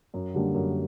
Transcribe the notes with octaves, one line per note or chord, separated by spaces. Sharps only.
F#2
D3 G3 A#3 D4
F#2